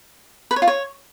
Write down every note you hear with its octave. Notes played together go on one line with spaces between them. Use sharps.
B4
C#5
F4
C#5